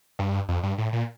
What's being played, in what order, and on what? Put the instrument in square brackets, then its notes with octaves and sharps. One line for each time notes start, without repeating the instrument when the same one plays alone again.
[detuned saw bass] G2
F2
G2
A2
A#2